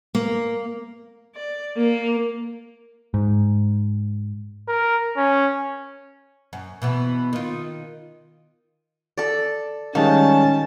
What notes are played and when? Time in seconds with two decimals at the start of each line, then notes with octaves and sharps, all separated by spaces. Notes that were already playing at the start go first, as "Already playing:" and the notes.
0.15 A#3
1.35 D5
1.77 A#3
3.14 G#2
4.68 A#4
5.17 C#4
6.53 F#2
6.82 B2 E3 B3
7.33 D#3 F4
9.18 A4 D5
9.95 D#3 G3 G#3 C#4 F5 A5